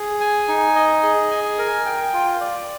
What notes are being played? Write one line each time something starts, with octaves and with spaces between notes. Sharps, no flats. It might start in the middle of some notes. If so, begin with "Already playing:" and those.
Already playing: G#4
G#5
D#4
D#5
G#4
G#5
A#4
G5
F4
D5